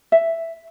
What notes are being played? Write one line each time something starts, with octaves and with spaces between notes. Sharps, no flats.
E5